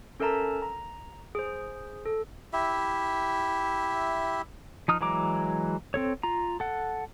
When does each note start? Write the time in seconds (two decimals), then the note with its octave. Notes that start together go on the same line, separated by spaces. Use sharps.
0.20 C#4 A4 A#4 E5 A5 A#5
0.62 A#5
1.35 G#4 C5
2.05 A4
2.53 E4 G4 E5
4.88 F3 D#4 D#6 F6
5.01 E3 F#3 G#3 A#5 D6
5.94 C4 A4 C#5
6.23 F4 A#5
6.60 A4 F#5